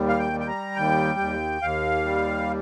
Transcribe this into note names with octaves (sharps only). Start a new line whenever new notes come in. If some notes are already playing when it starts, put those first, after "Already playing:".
Already playing: D#2 G3
F5
G5
G3
G5
A#5
D#2 G5
D#2
D#2 F5
G3